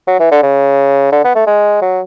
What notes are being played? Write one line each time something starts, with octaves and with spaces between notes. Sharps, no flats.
F#3
E3
D3
C#3
D3
B3
A3
G#3
F#3